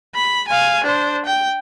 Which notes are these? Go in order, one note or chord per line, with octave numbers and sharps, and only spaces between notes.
B5
F5 G#5
D4 C5
G5